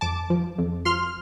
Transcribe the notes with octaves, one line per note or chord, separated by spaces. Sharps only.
F2 A5 D6
F3
F2
F3 C6 F6